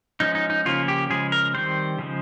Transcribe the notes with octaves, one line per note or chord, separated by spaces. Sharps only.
F3 G#3 C#4 D#4
D#4
D#4
C#3 F3 A#3 C#4 F4
G4
C#3 F3 G#3 G#4
A#4
D#3 G3 C4 C5
C#3 F3 G#3